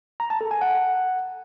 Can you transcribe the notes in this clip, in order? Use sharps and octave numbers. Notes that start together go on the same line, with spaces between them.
A#5
A5
A4
G#5
F#5